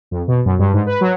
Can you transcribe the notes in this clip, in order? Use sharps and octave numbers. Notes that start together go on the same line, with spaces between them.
F2
B2
F#2
G2
G#2
B4
F#3